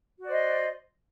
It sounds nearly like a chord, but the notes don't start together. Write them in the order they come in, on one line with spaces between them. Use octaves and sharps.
F#4 D5 C5 D#5